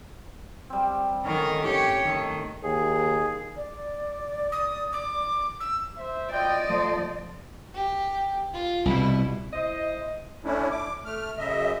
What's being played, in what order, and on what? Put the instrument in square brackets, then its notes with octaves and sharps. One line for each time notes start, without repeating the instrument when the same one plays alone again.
[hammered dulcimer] G3 C4
[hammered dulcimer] A2 D3 C#4 [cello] D#3 A#4
[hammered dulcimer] C3 [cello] G4 C#5
[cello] D#3 [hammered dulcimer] A3
[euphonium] D#2 [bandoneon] G#4
[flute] D5
[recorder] D#6
D6
E6
[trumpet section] C5 E5
[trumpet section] E4 F4 G5 [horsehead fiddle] D5 D#5
[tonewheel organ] F3 A3 [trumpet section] C5 C6
[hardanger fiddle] G4
F4
[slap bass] C2 B2 [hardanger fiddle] E4
[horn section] E4 C5 D#5
[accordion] A3 C#4 D4 E4
D6
A3 F6
F#2 C#3 D#5 E5